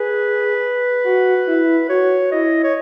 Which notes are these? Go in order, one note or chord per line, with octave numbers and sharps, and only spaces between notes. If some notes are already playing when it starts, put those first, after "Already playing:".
Already playing: G#4 B4
F#4
E4
F#4 C#5
E4 D#5
C#5